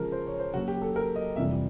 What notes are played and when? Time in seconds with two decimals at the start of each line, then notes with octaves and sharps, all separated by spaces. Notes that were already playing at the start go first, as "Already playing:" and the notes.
Already playing: C#3 F3 G#3 A#4
0.12 C5
0.27 C#5
0.39 C5
0.54 C#3 F#3 A#3 F#4
0.68 G4
0.82 A4
0.96 A#4
1.16 D#5
1.36 F2 C3 E3 G3 E5